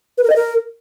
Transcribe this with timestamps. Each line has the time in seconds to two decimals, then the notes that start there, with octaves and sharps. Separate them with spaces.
0.18 B4
0.24 A#4
0.30 D#5
0.36 A#4